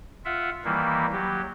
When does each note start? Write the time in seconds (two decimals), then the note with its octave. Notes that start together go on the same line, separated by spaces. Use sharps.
0.25 F4 E5 F#5
0.65 D#3 E3 G3 A#3 E4
1.12 F#3 G4